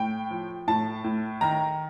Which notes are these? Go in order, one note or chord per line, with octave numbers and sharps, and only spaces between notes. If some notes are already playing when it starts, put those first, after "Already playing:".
Already playing: A2 G5
F3
A2 A5
A2
D#3 A#5